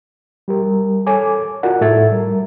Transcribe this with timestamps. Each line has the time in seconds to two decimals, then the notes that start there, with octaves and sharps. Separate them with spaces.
0.48 G3 G4 A#4
1.07 A4 C#5 G#5 D6
1.63 F4 F#4 A#4 D5 F#5
1.81 A2 A4 E5 G#6 A6
2.12 G3 A#4